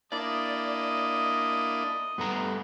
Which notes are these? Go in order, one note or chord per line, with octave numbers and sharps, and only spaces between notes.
A#3 D4 E4 D5 D#5
G2 A3 B3 A#5